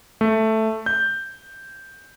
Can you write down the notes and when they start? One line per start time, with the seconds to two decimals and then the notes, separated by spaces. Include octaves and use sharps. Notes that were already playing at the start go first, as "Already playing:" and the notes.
0.21 A3
0.86 G6